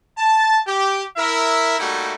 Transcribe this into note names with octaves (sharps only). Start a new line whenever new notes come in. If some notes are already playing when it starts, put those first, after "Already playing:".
A5
G4
E4 A#4 E5
G3 A3 A#3 D#4 E4 F#4